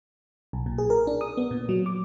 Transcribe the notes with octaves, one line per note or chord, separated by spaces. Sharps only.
B1
A#2
G#4
A#4
D4
D#6
B3
A#2
F#3
D6